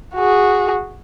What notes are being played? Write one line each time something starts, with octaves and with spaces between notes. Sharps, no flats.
F#4 G#4